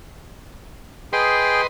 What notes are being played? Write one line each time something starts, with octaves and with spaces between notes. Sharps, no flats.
G#4 B4 D#5 G5 C6